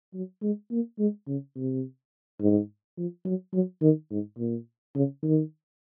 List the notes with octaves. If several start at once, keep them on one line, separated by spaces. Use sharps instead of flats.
F#3
G#3
A#3
G#3
C#3
C3
G#2
F3
F#3
F#3
D#3
G#2
A#2
C#3
D#3